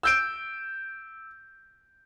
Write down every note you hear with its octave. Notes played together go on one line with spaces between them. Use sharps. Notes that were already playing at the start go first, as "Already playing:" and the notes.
E6 G6 D7